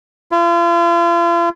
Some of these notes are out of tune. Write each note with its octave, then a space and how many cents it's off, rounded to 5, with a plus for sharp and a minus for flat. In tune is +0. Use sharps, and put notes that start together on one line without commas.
F4 -40